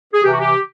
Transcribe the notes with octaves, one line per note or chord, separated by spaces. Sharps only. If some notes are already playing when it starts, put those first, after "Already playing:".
G#4
C3 E3 G4
F#4
G4